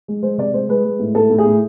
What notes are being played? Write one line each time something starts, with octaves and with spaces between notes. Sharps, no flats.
G#3
G#3 C5
C3 D5
G#3 C5
G#3 B4
G#3
A2
A2 A4
A2
G#4
A2